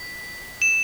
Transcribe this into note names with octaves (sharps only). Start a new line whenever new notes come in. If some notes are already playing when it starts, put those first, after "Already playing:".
Already playing: B6
E7